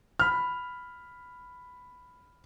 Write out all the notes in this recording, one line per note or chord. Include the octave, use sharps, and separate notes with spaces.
B5 F6